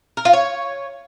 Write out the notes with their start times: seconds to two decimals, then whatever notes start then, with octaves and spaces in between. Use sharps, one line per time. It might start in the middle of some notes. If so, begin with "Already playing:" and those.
0.17 A#4
0.25 F4
0.33 C#5